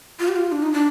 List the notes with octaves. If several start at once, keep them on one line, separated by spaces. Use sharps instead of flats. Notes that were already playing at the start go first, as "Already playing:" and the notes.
F4
G4
F4
D4
D#4
D4